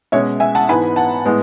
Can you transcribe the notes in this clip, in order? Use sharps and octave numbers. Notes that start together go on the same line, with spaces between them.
B2 G#3 C#4 C#5 E5
E5 G#5
F#5 A5
G#2 E3 B3 G#5 B5
F#5 A5
A2 G#3 B3